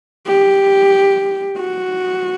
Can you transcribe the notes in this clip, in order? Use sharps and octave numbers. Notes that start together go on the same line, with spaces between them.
G4
F#4